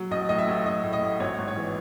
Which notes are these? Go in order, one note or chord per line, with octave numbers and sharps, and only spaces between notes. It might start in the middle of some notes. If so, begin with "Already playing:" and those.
Already playing: F#3
A1 D#5
A2 D#5
E5
A1
A1 D#5
A2
D#5
A1
G#1 C#5
G#1
C#5
E3